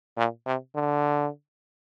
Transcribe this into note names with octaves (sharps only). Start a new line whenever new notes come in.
A#2
C3
D3